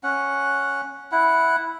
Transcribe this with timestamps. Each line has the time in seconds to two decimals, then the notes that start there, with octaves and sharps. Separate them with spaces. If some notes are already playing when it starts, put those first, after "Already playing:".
0.03 C#4 F#5
1.12 E4 F#5